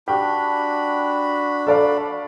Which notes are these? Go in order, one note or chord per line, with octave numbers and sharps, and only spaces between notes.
D4 F#4 G4 B5
A4 D5 F5